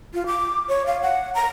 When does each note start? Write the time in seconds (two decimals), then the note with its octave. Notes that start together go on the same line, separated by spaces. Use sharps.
0.14 F4
0.26 D6
0.69 C#5
0.86 F5
1.02 F#5
1.35 A#5